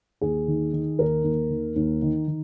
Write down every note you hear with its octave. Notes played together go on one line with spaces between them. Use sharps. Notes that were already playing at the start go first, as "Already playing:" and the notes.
D#2 G#4
D#3
D#3
D#2 A#4
D#2
D#3
D#2
D#3
D#3